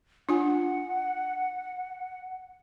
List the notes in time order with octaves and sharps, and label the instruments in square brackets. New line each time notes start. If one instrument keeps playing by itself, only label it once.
[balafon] D4 F4 G#5 [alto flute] F#5